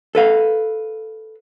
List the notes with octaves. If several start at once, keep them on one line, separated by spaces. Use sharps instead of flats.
A4 B4 F5